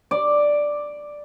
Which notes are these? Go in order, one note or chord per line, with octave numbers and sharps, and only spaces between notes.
D5